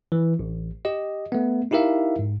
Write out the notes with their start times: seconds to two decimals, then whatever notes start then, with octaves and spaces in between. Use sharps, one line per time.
0.12 E3
0.39 A1
0.85 G4 D#5
1.32 A3 B3
1.71 D#4 E4 G4 A#4 E5 F5
2.19 G#2